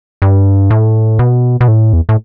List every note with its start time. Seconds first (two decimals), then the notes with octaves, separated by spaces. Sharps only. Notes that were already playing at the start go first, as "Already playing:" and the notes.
0.22 G2
0.71 A2
1.19 B2
1.61 B2
1.68 A2
1.93 E2
2.09 A2